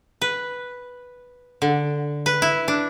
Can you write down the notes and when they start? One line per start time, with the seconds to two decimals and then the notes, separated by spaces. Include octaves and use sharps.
0.21 B4
1.62 D3
2.26 B4
2.42 E4
2.68 D4